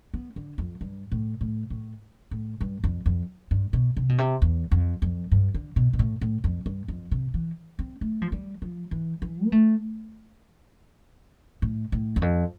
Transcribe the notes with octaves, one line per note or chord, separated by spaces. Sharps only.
B3
D3
F2
G2
A2
A2
A2
A2
G2
F2
F2
G2
B2
C3
B2
C3
E2
F2
F2
G2
D3
B2
B2
A2
A2
F2
G2
F2
C3
E3
C4
A3
F3
G3
F3
E3
E3
B3
A3
A2
A2
E2
F2